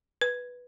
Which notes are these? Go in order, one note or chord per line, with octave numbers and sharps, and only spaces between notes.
B4